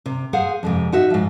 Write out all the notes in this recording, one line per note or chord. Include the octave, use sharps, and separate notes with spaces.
C3
G#4 C5 F5 F#5
F2 G#2 C3
D#4 F#4 E5
G#2 F3